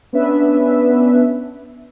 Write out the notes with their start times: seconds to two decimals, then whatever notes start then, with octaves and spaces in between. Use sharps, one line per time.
0.13 B3 C#4 D4 B4 E5